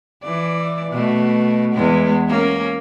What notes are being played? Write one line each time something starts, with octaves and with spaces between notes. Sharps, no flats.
E3 D5
B2 A3
E2 G#3 B3
A#3 C#4